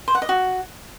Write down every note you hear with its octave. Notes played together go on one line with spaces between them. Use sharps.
C5
F#5
D#5
F#4